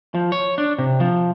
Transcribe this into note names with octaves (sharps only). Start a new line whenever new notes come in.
F3
C#5
D4
C3
F3